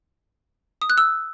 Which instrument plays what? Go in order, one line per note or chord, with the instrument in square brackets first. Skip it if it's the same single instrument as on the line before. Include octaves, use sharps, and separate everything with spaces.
[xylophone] D#6
F#6
E6